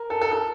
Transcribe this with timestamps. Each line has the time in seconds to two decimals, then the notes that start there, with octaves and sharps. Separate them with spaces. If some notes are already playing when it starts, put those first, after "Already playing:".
Already playing: A#4
0.10 A4
0.21 A4
0.32 A4